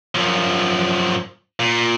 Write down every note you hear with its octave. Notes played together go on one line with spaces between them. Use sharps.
F#2 F3
A#2